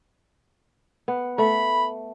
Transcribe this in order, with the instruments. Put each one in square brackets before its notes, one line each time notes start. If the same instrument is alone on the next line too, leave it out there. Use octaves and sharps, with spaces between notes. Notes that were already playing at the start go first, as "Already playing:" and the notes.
[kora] B3
[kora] A3 [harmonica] B5